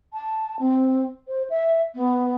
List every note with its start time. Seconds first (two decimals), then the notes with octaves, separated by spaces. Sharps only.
0.13 A5
0.59 C4
1.28 C5
1.50 E5
1.95 B3